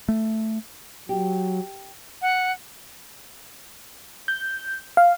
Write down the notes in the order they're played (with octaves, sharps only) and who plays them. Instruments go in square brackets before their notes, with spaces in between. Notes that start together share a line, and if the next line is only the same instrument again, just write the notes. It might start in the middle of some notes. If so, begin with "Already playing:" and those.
[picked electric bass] A3
[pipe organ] F#3 [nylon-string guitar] G4
[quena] F#5
[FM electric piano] G6
F5